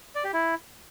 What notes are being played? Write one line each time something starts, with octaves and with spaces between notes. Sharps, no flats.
D5
G4
E4